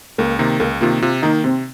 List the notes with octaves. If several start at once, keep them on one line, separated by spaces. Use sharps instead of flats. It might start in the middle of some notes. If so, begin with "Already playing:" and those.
C#2 A#3
C3 D#3 A#3
C#2 A#3
C3 D#3 A#3 F4
C3 F4
D#3 A#3 D#4
C3 C4